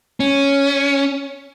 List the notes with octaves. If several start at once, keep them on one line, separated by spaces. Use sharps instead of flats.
C#4